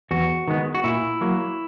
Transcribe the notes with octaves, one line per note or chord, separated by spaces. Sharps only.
E2 F#4
D#3 G#3 B3
F#4
A#2 E4
F#3 A#3